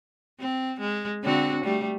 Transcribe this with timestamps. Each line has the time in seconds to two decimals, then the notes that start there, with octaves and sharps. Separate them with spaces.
0.40 C4
0.81 G#3
1.23 D3 C4 F#4
1.65 G3 A3